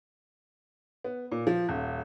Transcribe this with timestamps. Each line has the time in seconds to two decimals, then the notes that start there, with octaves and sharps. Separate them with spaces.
1.04 B3
1.32 A#2
1.47 F3
1.69 D#1